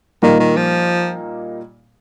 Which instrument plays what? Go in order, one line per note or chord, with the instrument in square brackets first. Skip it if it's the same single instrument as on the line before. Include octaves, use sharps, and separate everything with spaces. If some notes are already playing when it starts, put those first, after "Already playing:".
[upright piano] A#2 G3 A#3 D#4 [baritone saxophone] D#3
[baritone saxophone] D#3
F3